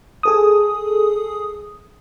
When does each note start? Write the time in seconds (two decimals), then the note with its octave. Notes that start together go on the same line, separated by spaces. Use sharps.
0.23 G#4 A4 D#6